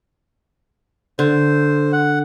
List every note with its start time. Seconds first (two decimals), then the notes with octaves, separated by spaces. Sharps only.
1.19 D3 C5
1.92 F#5